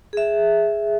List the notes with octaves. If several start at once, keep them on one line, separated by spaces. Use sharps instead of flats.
G#4 E5